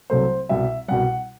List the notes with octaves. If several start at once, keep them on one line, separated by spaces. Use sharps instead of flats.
C2 C3 F#3 A3 C5
C2 B2 G3 E5
C2 B2 G3 F#5